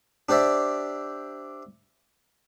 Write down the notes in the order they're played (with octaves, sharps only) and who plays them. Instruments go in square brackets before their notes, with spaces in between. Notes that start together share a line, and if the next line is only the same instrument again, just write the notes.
[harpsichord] D4 G4 C5 D5 E5